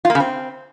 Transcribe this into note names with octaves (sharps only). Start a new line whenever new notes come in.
F4
A#3
C#3
C4